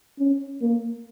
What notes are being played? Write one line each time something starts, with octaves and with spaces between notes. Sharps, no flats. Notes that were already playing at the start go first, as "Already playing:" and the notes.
C#4
A#3